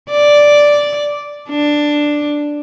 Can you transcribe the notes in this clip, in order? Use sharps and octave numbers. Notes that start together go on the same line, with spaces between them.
D5
D4